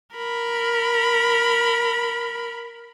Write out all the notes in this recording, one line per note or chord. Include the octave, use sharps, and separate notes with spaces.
A#4 B5